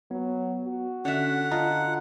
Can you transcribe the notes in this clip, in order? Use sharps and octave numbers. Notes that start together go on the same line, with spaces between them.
F#3 B3
F#4
D3 C#4 E5 F#5
F4 D#5 A5 A#5